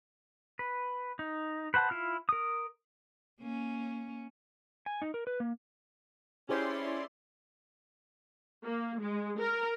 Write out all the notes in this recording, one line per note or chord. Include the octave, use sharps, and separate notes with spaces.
B4
D#4
B4 C5 F#5 A5 B5
E4 F4 F6
A#4 D#6
A#3 C#4
G#5
D#4
A#4
B4
A#3
C#4 E4 G4 G#4 C5 D5 C6
A#3
G#3
A#4